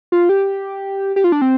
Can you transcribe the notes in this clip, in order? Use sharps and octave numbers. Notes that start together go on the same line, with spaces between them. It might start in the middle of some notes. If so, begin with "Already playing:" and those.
F4
G4
G4
F4
D4
C4